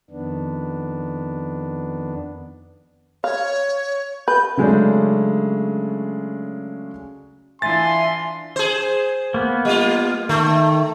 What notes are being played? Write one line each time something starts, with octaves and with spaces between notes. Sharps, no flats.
F2 D#3 B3 D4
C#5 F5
B4 G6
C#3 F#3 G#3 A3 C#4 D4
E3 D4 F4 E5 G#5 C6 A6
G#4 C5
A#3 B3
G3 F4
D#3 A3